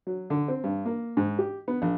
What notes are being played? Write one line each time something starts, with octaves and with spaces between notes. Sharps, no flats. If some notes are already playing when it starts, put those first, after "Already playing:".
F#3
D3
C4
G2
A#3
G#2
G4
B3
A#1